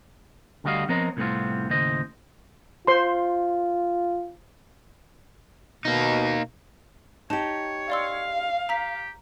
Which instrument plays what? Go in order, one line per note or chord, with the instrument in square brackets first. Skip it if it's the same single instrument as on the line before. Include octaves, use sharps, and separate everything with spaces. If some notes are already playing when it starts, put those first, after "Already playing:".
[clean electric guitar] D2 D3 G3 F#4 D#5 F5
F3 B3 C4 A#4 C#5 D#5
C2 A2 A3 B3 C4 F4
D#2 A2 C#3 C5 D#5
[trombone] F4 [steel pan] C5 C6
[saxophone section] B2 [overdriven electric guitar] A#3 D#4
[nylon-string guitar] D#4 G4 [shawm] C#5 [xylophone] A5
[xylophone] D5 C6 E6 [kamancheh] F5
[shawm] G4 [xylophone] A#5 B6